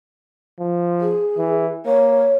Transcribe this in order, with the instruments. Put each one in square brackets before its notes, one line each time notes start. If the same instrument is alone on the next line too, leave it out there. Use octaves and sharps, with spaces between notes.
[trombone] F3
[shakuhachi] G#4
[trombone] E3
[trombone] A#3 [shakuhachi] C#5